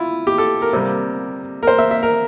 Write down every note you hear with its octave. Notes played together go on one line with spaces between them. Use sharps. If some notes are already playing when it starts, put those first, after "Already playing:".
Already playing: E4 F4
G4
A4
A#4
C3 G3 A#3
A#4
C5
E5
E5
A#4